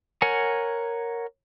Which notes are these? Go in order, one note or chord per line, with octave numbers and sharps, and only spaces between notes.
A#4 C#5 F#5 G#5